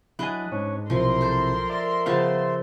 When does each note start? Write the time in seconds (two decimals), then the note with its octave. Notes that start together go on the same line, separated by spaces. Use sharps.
0.19 F#3 D4 E4 B4 D#5 G#5
0.52 G#2 C#4 C#5
0.90 B1 C3 F3 E4 A#4 C6
1.21 A4 C5
1.70 D5 E5
2.06 C#3 F3 B3 B4 F5 A5